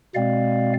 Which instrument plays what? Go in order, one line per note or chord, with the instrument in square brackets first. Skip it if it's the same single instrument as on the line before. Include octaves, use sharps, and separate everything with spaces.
[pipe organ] B2 G#3 C4 D5 F5